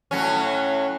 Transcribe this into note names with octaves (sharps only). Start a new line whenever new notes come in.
A2 F#3 C#4